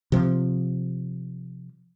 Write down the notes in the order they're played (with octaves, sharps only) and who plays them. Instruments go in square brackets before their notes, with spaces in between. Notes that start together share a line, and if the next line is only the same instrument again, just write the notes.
[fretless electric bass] C3 F3